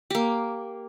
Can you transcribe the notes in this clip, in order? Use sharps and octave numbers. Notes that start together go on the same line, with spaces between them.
A#3 G4